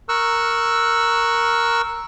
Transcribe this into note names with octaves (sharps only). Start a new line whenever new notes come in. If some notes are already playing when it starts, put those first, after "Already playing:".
A#4 C#6 E6 F#6